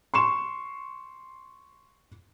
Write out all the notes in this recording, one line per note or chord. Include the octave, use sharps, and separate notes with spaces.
C6 C#6 E7